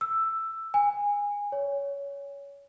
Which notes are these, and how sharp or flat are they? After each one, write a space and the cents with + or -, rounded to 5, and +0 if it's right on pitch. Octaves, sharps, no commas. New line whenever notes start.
E6 +5
G#5 -20
C#5 +20